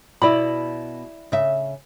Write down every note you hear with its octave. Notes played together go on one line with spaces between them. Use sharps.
B2 E4 D5 B5
C#3 E5